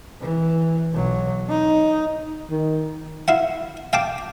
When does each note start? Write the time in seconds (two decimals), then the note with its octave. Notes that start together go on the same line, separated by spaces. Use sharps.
0.20 E3
0.92 B1 F#3
1.49 D#4
2.49 D#3
3.28 E4 F5 F#5
3.93 F5 G5 A5 D6